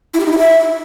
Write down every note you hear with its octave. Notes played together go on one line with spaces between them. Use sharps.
E4
G4
D#4
E4
E5